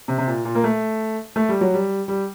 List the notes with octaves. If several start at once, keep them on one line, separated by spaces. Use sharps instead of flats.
C3
C3
A#2
A#2
A#3
A3
A3
G3
F#3
G3
G3